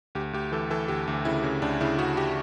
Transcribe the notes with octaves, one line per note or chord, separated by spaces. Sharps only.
D2 G4
D2 G4
E3 A4
E3 A4
D2 G4
D2
C#3 E4
C#3
D2 D4
C#3 E4
C#3 F#4
G4